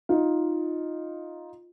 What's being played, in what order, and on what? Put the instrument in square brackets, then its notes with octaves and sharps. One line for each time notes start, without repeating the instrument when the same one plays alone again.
[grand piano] D#4 F4